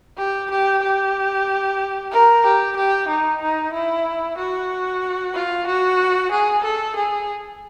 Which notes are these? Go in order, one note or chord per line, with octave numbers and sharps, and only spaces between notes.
G4
G4
G4
A#4
G4
G4
D#4
D#4
E4
F#4
F4
F#4
G#4
A4
G#4